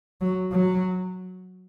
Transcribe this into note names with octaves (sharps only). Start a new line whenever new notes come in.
F#3
F#3